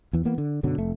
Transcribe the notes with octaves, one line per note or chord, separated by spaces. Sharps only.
E2 E3
E3 A#3 B3
D3
F#2 B2 D3 F#3
F1 A3